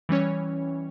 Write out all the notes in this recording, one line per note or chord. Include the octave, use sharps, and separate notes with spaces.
E3 G3 C#4 C#5